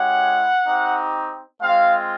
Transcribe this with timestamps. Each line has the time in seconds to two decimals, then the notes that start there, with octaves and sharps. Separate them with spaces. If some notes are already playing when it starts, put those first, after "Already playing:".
Already playing: G#3 C#4 E4 G4 F#5
0.67 C4 D#4 G4
1.61 G#3 C4 F4 F5